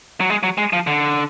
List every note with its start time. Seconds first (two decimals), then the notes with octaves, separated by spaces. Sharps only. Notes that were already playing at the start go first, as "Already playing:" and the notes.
0.20 F#3
0.30 G#3
0.43 F#3
0.58 G#3
0.73 F3
0.87 D3